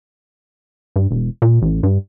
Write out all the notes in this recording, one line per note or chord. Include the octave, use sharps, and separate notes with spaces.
G2
E1
A#2
A1
G2